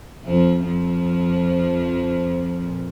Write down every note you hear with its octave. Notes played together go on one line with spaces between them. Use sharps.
F2 F3
F2 F3
A#2